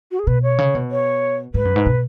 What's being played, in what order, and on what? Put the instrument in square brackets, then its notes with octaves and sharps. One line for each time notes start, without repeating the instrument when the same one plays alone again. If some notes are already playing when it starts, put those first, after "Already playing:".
[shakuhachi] F#4
G#4
[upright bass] B2 [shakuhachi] B4
[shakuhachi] C#5
[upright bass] C#3
B2
[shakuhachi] C#5
[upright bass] G#2 [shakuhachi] B4
[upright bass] F#2
G#2
B2